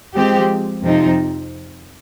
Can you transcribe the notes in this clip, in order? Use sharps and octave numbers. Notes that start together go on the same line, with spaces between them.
F3 G#3 C4 G4
F2 C3 F3 C4 D#4